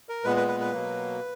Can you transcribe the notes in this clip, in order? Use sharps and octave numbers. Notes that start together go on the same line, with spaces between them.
A#4
A#2 G#3 B3 B4
B4
B4
B4
B2 F#3 A#3